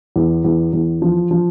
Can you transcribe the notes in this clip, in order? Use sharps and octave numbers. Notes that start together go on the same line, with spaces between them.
E2
E2
E2
F3
F3